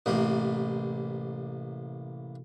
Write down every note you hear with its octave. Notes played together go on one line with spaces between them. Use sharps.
A1 C3 A#3